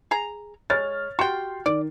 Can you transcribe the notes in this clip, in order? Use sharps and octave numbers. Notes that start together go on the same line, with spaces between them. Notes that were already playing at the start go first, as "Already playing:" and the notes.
G#4 A#5
G#3 C#5 F6 A6
F#4 G4 G5 C6
D#3 D5